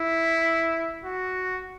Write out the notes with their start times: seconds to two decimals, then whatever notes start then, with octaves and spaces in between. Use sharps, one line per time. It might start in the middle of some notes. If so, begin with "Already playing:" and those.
Already playing: E4
1.05 F#4